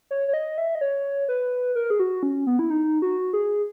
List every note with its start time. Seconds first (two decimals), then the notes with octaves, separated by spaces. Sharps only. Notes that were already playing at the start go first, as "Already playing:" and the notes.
0.11 C#5
0.28 C#5
0.34 D#5
0.58 E5
0.75 D#5
0.81 C#5
1.29 B4
1.75 A#4
1.90 G#4
2.00 F#4
2.23 C#4
2.47 B3
2.59 E4
2.70 D#4
3.02 F#4
3.33 G#4